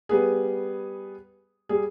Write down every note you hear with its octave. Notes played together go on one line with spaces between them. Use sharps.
G3 B3 G#4
G3 G#4